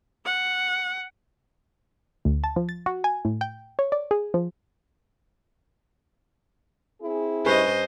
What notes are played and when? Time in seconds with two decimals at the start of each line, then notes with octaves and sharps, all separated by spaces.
0.25 F#5
2.25 D2
2.44 A5
2.56 F3
2.69 A6
2.86 F#4
3.04 G#5
3.25 A2
3.41 G5
3.79 C#5
3.92 D5
4.11 G#4
4.34 F3
7.01 C4 E4 G#4
7.46 G2 C#4 B4 C5 D#5